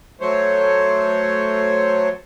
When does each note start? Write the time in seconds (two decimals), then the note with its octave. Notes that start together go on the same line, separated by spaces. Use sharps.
0.21 F#3 A3 C5 C#5